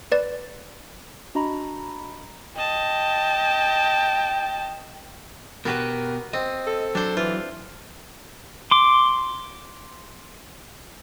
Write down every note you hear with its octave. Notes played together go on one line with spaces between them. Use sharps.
B4 D5
D4 F#4 D#5 A#5 B5
D#5 G5 A5
B2 B3 F#4 G4 A#4 B4
C4 D#5
A4
F#3 D4 C5
E3 F4
C6 D6